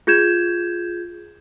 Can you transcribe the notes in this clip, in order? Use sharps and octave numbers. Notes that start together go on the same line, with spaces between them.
F4 G#4 G6 G#6 E7